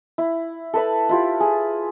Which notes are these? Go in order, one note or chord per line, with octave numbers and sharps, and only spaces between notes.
E4
A4 B4 E5 B5
E4 F4 G4
G#4